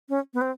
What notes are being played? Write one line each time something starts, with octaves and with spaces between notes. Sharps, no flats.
C#4
B3
C4